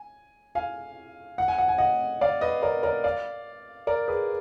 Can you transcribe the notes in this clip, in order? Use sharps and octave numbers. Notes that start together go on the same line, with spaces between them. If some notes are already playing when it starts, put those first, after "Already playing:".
Already playing: G#5
F5 G#5
F#5
G#5
F#5
G#5
D#5 F#5
D5 F5
B4 D#5
A#4 D5
A#4 D5
D5 F5
A#4 D5
G#4 B4